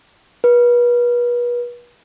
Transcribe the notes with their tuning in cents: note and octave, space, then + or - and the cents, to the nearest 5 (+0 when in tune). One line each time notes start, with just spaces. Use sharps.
B4 -35